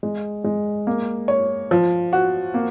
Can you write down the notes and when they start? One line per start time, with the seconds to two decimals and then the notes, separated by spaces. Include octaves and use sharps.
0.03 G#3
0.44 G#3
0.87 A#3
1.28 C#5
1.71 F3
2.13 F#4
2.54 A#3